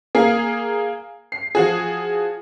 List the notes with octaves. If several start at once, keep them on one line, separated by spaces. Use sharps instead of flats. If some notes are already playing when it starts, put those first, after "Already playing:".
A#3 G#4
C7
F3 F#4 G#4